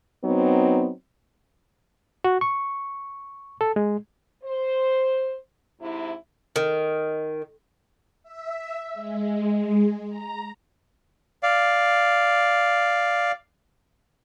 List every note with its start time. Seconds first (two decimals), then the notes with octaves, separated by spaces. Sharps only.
0.24 F#3 B3 C4 D#4
2.24 F#4
2.41 C#6
3.61 A4
3.76 G#3
4.44 C5
5.80 G#2 C3 E4
6.56 D#3
8.23 E5
8.94 G#3
10.08 A#5
11.43 D5 F5